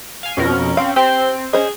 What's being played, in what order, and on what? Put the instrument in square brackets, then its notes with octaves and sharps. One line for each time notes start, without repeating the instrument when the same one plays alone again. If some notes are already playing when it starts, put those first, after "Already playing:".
[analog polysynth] F5 G#5
[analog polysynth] F2 B2 A#4 [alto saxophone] C#4
[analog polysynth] C4 [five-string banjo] F5
[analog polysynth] C4 [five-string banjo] G4 [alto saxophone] C5
[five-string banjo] C#4 C5 D#5 [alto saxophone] G#4